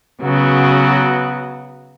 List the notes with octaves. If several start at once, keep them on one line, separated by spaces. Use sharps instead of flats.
C#3 F#3 B3 F#4